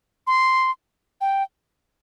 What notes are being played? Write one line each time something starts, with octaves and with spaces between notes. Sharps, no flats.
C6
G5